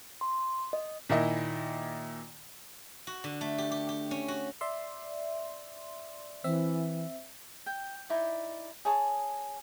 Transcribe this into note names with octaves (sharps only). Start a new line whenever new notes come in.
C6
D#5
A#2 D#3 E4 D#5
F#4
D3
A3
G4
G4
G4
C#4
F#4
D5 E5 C6
E3 C4 E5
G5
D#4 E4 D5
G#4 C#5 A5 D#6